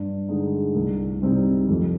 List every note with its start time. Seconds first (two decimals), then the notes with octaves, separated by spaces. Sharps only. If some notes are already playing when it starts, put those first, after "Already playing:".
Already playing: G2
0.29 D3 G#3 D#4
0.75 C2
1.22 C3 G3 C4 D#4
1.69 F2